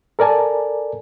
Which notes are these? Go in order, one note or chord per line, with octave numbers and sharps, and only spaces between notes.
A4 A#4 D5 G#5 A5